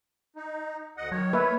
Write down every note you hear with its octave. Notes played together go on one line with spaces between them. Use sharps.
D#4
D2 D#5 F#5
D#3 F#3 C#5
A#3 B4 E5